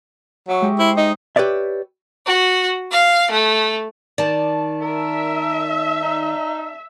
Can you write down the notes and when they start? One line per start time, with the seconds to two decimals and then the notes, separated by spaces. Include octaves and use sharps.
0.48 F#3 E5 C#6
0.62 G#3 G4
0.79 E4 C5
0.97 D#4 D#5
1.36 G4 B4 C#5 D5 E5
2.25 F#4
2.91 F5
3.30 A3
4.18 D#3 D5 A5
4.82 A#4 E5
6.03 D#4